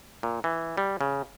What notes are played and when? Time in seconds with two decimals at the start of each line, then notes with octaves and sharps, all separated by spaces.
0.23 A#2
0.44 E3
0.77 G3
1.01 C#3